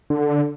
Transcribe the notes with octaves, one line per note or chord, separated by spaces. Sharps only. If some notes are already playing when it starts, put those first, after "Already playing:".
D3